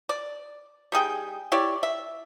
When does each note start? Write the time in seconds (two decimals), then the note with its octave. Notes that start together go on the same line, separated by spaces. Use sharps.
0.09 D5
0.92 G3 D#4 G#4 G5
1.52 E4 G4 C#5 D5
1.83 E5